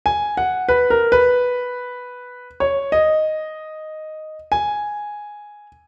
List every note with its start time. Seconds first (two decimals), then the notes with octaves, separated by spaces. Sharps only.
0.06 G#5
0.37 F#5
0.69 B4
0.90 A#4
1.12 B4
2.60 C#5
2.92 D#5
4.52 G#5